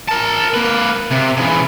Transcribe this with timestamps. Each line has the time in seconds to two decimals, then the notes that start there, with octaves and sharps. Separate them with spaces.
0.08 A#4 A5
0.54 A#3 B4
1.11 C3
1.38 C#3 E3